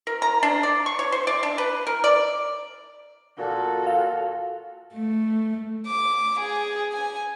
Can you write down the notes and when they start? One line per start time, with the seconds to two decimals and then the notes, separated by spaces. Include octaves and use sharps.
0.07 A#4
0.22 A#5
0.43 D4
0.63 D5
0.86 C#6
0.99 C#5
1.12 C5
1.27 D5
1.43 D4
1.58 B4
1.87 A#4
2.04 D5
3.37 A#2 F#4 A4
3.87 F5
4.94 A3
5.86 D6
6.39 G#4
6.92 G#5